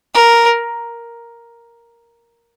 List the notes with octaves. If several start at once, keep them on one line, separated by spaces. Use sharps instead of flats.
A#4